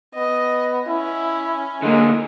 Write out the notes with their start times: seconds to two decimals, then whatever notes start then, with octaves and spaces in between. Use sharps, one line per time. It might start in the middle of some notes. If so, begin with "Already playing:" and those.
0.15 B3 D#5
0.88 C#4 E4
1.82 D3 G#3 A#3